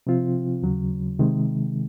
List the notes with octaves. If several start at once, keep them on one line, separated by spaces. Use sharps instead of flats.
C3 F3 C4 F4
D#2 C#3 F#3
C3 D#3 G#3